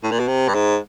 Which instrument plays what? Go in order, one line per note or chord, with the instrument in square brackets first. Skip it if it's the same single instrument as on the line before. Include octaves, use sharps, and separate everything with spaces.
[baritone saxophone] A2
A#2
B2
C3
G2
G#2